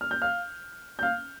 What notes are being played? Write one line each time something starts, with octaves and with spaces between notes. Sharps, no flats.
F6
G6
F5 F6
G6
F5 F6